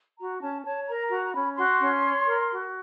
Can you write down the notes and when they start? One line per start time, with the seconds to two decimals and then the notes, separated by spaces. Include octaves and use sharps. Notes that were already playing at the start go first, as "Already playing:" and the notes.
0.18 F#4 A#5
0.41 C#4 A5
0.64 C#5 A5
0.87 A#4 A#5
1.10 F#4 A#5
1.25 A#5
1.34 C#4 B5
1.57 F#4 C6
1.80 C#4
2.03 C#5
2.26 A#4
2.49 F#4